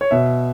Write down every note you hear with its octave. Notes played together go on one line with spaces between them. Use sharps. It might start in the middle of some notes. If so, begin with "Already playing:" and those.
C#5
B2 E5